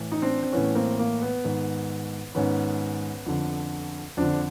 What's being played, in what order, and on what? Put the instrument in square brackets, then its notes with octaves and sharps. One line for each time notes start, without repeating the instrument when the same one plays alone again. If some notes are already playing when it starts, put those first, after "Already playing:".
Already playing: [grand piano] A2 E3
D#4
C4 D4
C4
A2 E3 B3 C#4
A#3 C4
A#3
B3
G#2 D#3
G#2 D#3 B3 C#4
F2 D3
F2 D3 C4 D4